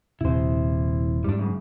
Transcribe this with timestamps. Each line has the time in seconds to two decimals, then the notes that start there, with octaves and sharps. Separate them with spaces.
0.21 D#1 C3 E4 C5
1.24 G#2 G3 D4
1.38 F#2 C#3